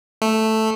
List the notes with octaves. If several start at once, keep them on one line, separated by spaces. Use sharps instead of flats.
A3